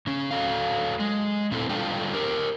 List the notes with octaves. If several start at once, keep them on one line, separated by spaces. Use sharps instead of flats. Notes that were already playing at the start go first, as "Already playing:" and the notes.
C#3 C#4
F#3 A4 F5
G#3
A#2 C4 E4 F#4 A4
G3 D4 F4 A4 F5 G5
G4 A#4